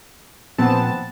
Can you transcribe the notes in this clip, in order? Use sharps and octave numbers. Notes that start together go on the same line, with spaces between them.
A#1 B3 C4 F#5 A5